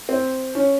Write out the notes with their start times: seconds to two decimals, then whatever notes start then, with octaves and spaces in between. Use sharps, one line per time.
0.09 C4
0.55 C#4